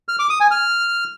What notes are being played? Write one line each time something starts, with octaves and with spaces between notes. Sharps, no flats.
F6
D6
D#6
G#5
F6